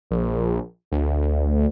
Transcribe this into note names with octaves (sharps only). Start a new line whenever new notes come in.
A#1
D2